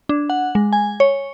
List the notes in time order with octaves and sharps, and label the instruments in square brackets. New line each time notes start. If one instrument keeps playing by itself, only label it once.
[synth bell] D4
F#5
G#3
G#5
C#5